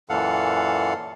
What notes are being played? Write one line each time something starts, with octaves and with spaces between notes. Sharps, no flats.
F#2 A#2 E3 A4 F5 F#5